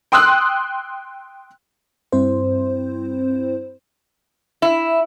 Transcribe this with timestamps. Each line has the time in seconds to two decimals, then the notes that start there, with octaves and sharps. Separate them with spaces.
0.12 G5 C6 D#6 E6 F#6
2.12 G2 C4 E4 C5
4.62 E4